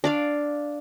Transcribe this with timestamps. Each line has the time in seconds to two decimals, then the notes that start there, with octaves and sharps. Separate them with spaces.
0.04 D4 D5 F5